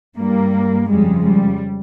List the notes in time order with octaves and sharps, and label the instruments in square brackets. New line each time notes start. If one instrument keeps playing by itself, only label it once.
[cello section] G2 G3 A#3
F2 C#3 G3 G#3
G3